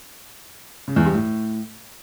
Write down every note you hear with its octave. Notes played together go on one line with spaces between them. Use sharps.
C#3
E2
G2
A2